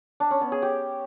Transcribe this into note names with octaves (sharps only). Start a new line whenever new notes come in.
D4
C#4
B3
G#4
G4